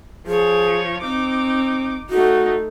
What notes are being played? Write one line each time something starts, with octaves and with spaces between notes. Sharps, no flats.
F3 G#4 C#5
C4 D#4 D6
A3 D#4 F#4